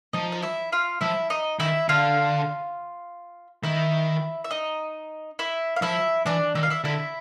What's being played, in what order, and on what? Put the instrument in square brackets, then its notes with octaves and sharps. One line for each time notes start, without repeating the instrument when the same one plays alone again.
[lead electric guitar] F3 [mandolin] D#4 D#5
[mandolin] D#5
E4 E5
F4 F5
[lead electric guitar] F3 [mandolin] E4 E5
[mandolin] D#4 D#5
[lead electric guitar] D#3 [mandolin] E4 E5
[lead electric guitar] D3 [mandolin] F4 F5
[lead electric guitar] D#3 [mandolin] E4 E5
[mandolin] E5
D#4 D#5
E4 E5
F5
[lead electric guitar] F3 [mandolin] E4 E5
[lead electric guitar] E3 [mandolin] D4 D5
[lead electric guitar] D#3 [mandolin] E5
[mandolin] F5
E4 E5
[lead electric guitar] D3 [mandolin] E4 E5